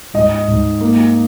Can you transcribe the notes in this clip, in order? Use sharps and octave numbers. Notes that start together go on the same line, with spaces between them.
G#2 D#5
G#2
A#3